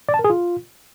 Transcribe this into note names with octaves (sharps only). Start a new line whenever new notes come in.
D5
A5
A#4
G#4
F4